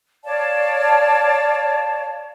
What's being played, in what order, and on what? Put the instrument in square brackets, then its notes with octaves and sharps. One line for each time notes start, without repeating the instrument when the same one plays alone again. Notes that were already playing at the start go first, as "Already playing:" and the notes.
[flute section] C#5 D5 F5 A5